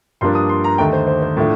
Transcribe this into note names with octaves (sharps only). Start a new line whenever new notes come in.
G2 F3 A#3 D4 C6
D#6
C6
A#5
D#2 D3 A3 G5
C5
C5
C5
A2 F3 A3 D4